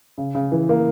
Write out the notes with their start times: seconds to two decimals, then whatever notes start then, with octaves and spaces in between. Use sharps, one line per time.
0.18 C#3
0.35 C#3
0.52 E3
0.69 A#3